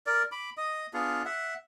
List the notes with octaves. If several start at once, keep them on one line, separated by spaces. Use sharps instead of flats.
A#4 D5
B5 D6
D#5 D#6
B3 D4 F4 G#4
E5 F#5